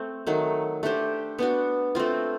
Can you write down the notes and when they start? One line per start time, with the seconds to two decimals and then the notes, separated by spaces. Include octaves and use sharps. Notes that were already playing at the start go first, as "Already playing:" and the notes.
Already playing: A3 C4
0.27 D#3 F#3 A3
0.83 A3 D4 G4 C5
1.39 B3 D4 F#4
1.95 A3 C4 F4